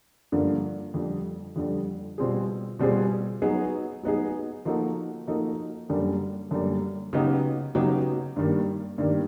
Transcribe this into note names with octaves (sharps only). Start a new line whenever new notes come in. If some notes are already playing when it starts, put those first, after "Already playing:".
G2 D3 F3 A#3
F2 D3 G3
F2 D3 G3
B2 G3 C4 F4 G#4
B2 G3 C4 F4 G#4
F#3 B3 D#4 G#4
F#3 B3 D#4 G#4
F3 A#3 D#4 F#4 A4
F3 A#3 D#4 F#4 A4
F#2 D3 G3 A#3
F#2 D3 G3 A#3
C#3 F#3 B3 D#4 G4
C#3 F#3 B3 D#4 G4
G2 D#3 G3 A#3
G2 D#3 G3 A#3